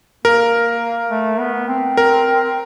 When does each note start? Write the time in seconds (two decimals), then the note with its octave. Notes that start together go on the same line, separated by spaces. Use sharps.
0.25 A#3 A#4
1.10 A3
1.39 B3
1.68 C4
1.97 A#4